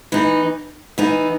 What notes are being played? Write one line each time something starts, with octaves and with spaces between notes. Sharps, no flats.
E3 B3 D#4
E3 B3 D#4